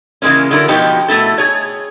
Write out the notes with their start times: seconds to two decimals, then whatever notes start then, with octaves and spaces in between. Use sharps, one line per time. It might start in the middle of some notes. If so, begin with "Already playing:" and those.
0.22 C#3 E3 F#3 G#3 A#3 C#4
0.51 D3 F#3 E4 A#4
0.68 B2 F3 B3 D#4 G4 B4
1.08 B2 A3 D#4 E4 A4
1.38 G#4 C#5